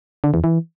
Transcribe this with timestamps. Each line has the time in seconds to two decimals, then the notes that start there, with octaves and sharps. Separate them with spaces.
0.24 D3
0.34 E2
0.44 E3